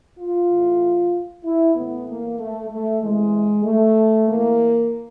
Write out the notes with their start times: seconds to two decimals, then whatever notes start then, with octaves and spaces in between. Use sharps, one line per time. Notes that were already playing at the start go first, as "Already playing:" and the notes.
0.19 F4
0.50 A2 E3
1.44 E4
1.76 A2 E3 B3
2.08 A#3
2.40 A3
2.70 A3
3.02 C3 E3 G#3
3.65 A3
4.28 C3 E3 A#3